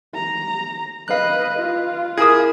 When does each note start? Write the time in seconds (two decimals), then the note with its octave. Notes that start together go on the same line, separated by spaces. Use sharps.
0.14 A#5
1.08 B4 D#5 F5 F#6
1.59 F4
2.18 E4 G#4 A#4 D#6